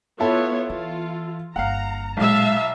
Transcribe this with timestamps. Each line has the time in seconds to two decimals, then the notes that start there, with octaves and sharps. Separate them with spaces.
0.20 B3 E4 F4 A4 C#5
0.70 E3 F4
1.56 G1 A#3 F5 F#5 A#5
2.17 B1 A#2 G#3 E5 F5 A5